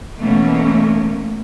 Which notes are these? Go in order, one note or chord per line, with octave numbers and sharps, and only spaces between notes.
B2 E3 A3 A#3 C#4